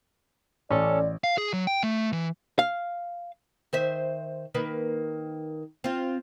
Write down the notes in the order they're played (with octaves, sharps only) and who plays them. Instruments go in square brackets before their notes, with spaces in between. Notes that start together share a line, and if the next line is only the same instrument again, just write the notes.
[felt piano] A1 [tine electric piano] C#4 A4 [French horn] D5
[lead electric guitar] F5
G#4
F#3
G5
A3
E3
[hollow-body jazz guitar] F5
[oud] D#3 C5 E5
D#3 A#3 B4
C4 F4